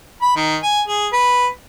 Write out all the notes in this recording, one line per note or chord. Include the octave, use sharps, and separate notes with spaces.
B5
D#3
G#5
G#4
B4